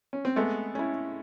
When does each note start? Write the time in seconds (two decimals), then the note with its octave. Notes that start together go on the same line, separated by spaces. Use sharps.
0.13 C#4
0.25 C4
0.36 G#3 A3 B3
0.75 C#4 E4